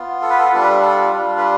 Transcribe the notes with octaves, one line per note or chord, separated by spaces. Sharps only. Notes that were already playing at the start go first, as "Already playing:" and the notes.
Already playing: B3 F4
A4
B4
A4
B4
G3 D4 F4 A4
B4
A4
A4
G3 D4 F4
B4